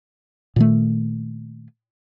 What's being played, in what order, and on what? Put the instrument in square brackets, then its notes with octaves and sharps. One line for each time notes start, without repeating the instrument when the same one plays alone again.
[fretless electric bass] A#2 D#3 A3